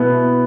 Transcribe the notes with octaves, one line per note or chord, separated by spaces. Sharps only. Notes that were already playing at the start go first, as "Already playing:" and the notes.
Already playing: B2 B3 E4